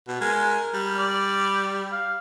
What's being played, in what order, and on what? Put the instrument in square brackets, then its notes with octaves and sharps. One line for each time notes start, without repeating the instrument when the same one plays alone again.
[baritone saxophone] B2
[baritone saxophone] G#3 [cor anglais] A#4
[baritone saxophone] G3
[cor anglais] D5
F5